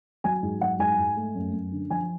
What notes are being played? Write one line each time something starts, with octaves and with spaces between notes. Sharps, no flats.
F#3 G#5
G#2
F#3 F#5
G#2 G#5
G#2
A3
F#2
F#2
D3
F3 G#5